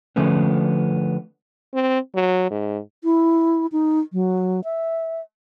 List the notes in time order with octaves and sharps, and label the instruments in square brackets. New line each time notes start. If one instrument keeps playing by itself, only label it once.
[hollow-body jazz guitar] D3 F3 A3 B3 C#4
[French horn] C4
F#3
G#2
[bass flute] E4
D#4
F#3
E5